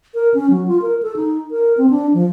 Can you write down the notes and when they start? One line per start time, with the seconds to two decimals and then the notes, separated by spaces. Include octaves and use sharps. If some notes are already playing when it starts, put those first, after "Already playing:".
0.14 A#4
0.34 C#4
0.50 F#3
0.68 F4
0.82 A#4
1.03 A4
1.16 D#4
1.51 A#4
1.78 C4
1.90 D4
2.14 F3